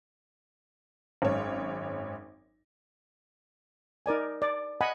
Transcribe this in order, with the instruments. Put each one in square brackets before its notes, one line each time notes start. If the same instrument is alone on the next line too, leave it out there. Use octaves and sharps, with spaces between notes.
[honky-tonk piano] G#1 F#2 G#3 C#5
[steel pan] D#4 A#4 D5 G#5
D5
D#5 F#5 G#5 B5